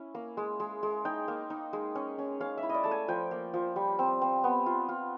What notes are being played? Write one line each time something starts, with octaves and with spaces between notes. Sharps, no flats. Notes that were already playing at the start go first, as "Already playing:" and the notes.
Already playing: C#4 E4
A#3
G#3
G#3
G#3
D#4 G5
A#3
D#4
G#3
C#4
C#4
C#4 F5
E5
E4
D5 D#5
A3 A5
G#5
F3 G5
A#3
F3
G3
C4
C4
B3
F4
F4